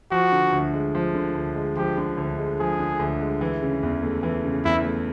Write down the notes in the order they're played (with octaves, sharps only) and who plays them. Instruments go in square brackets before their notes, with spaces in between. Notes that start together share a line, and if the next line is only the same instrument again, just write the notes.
[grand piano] F3 [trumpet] F#4
[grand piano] D3
D2
G#3
F3
D3
D2
G#3
[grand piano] F3 [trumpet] G4
[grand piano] D3
D2
G#3
[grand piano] F3 [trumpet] G#4
[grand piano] D3
D2
G#3
E3
C#3
E2
A3
E3
C#3
[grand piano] E2 [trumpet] E4
[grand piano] A3